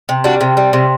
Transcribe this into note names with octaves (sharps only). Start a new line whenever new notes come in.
C3
G3 D4 F#4
C3
G3
C3